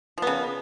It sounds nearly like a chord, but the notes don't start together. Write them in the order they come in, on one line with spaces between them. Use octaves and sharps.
F3 B3 C#3